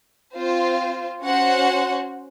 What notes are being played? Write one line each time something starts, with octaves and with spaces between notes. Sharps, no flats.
C4 F4 C5
C#4 F#4 C5 F#5